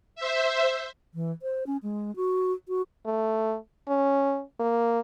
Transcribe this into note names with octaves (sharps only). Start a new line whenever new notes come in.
C5 E5
E3
C5
C#4
G#3
F#4
F#4
A3
C#4
A#3